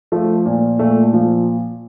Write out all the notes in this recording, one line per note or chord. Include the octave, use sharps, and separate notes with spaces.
F3 A3
A#2
A#2 A3
F3